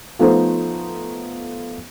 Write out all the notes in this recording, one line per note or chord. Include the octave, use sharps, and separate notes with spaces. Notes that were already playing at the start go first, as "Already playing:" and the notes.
F3 A3 B3 D#4 A4 C5